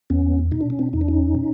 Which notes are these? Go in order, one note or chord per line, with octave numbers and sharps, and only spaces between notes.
E2 B3 C#4
B2 D#4
D4
C#4
C4 D4
E2 D#4
D4
C#4 D#4
B2